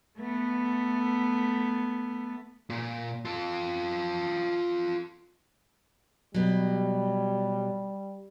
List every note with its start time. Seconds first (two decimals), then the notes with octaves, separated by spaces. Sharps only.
0.19 A3 B3
2.70 A#2
3.25 F4 A4
6.34 B2 F#3 G3